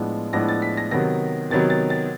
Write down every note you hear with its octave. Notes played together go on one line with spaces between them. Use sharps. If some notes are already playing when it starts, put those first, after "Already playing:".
Already playing: A2 F3 G#3 B3 D4
A2 F3 G#3 B3 D4 A#6
A6
B6
A#6
C3 D#3 F#3 B3 A#6
C3 D#3 F#3 B3 A6
A6
A6